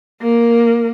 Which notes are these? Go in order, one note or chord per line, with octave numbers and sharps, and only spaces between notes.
A#3 A#4